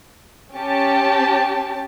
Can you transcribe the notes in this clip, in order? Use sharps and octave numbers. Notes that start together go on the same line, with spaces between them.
C#4 G4 A5